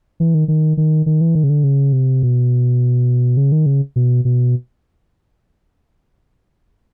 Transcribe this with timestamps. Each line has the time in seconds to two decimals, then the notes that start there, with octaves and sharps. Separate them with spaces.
0.20 E3
0.34 D#3
0.48 D#3
0.77 D#3
1.06 D#3
1.21 E3
1.35 D#3
1.44 C#3
1.50 D3
1.64 C#3
1.93 C3
2.23 B2
3.37 C#3
3.52 D#3
3.66 C#3
3.96 B2
4.25 B2